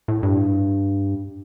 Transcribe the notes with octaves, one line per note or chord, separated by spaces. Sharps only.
A2
G2